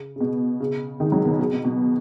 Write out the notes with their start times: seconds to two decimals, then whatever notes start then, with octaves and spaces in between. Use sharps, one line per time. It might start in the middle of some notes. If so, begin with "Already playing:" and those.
Already playing: C#3
0.16 C#3
0.21 B2
0.60 C#3
1.00 D#3 G#3
1.12 C#3 F#3
1.25 B2 D#3
1.39 C#3
1.52 B2
1.65 B2